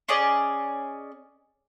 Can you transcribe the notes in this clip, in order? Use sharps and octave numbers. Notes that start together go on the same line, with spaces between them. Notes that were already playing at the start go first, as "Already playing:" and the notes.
C#4 G#4 D5 D#5